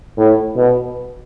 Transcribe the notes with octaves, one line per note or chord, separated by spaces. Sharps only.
A2
B2